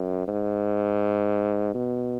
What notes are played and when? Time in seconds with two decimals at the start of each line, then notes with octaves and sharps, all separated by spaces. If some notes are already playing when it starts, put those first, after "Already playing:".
Already playing: F#2
0.28 G#2
1.74 B2